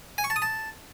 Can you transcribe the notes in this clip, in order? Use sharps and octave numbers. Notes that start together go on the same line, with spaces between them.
G#5
C#6
A5
D#6
A5